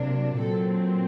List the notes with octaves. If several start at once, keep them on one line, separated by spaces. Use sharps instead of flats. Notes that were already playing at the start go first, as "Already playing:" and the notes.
Already playing: C3 F#3 A#3 D4
A#2 F#3 C4 A4